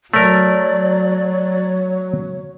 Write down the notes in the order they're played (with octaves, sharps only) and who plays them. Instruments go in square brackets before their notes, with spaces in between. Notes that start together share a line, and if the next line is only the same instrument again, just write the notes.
[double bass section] F#3 [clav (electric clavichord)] A3 A#4 [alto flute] C#5 [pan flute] D5